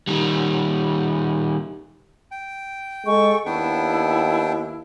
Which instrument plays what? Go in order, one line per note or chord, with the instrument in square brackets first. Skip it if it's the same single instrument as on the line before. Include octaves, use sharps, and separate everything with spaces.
[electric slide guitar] D#3 G3
[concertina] G5
[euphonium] G#3 [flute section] A4 C#6
[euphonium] D#2 [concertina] B3 D4 G5 [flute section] E4